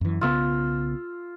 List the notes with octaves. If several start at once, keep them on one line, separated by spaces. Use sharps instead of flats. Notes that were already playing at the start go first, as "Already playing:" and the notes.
F#2 E3
B1 C#3 B3 F4 E6